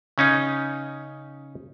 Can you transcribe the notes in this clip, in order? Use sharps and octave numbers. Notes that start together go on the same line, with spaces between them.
C#3 C#4 D#4